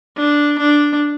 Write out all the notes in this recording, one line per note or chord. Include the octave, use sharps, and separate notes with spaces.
D4
D4